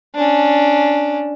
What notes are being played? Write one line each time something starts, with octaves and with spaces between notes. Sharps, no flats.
C#4 D4